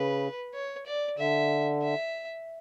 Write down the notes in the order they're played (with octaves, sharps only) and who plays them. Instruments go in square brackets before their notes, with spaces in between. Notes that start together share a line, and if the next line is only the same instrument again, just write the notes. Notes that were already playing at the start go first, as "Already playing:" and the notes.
Already playing: [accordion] C#3 [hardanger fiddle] B4
[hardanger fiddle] C#5
D5
[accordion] D3 [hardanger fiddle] E5
[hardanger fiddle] E5